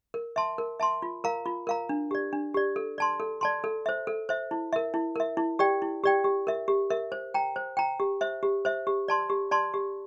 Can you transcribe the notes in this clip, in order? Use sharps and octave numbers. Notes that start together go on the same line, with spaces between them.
A#4
E5 A5 C6
A#4
E5 A5 C6
F4
A#4 F5 A#5
F4
A#4 F5 A#5
D4
G4 D5
D4
G4 D5
A4
D5 A5 C6
A4
D5 A5 C6
A4
C5 E5
A4
C5 E5
E4
A#4 E5
E4
A#4 E5
E4
G4 D5 G5
E4
G4 D5 G5
G4
A#4 E5
G4
A#4 E5
C5
G5 A#5
C5
G5 A#5
G4
C5 E5
G4
C5 E5
G4
D5 A5 C6
G4
D5 A5 C6
G4